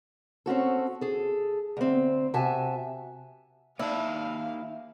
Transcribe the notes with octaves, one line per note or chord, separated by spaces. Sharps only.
C4 C#4 F#4 A4
G#4 A4
D2 C4
C3 F#4 E5 G#5 A5
A#3 D#4 E4 F5 A5